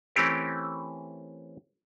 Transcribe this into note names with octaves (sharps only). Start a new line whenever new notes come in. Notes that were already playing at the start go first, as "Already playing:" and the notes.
E3 A3 C4 C#4 G4 A#4